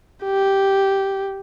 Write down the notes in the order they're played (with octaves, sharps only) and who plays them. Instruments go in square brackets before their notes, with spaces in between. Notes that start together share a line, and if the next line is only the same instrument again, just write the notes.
[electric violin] G4